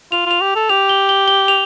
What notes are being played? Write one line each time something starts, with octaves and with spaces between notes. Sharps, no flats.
F4 F7
F4 F7
G4
A4
G4 F7
G7
G7
G7
F7